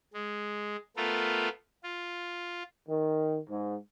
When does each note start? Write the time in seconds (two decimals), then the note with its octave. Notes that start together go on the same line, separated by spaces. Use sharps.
0.14 G#3
0.97 A3 B3 F4 A4 A#4
1.83 F4
2.89 D#3
3.50 G#2